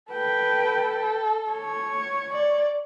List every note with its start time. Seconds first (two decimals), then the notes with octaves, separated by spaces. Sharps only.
0.13 A4 B4 G5
1.52 C#5
2.32 D5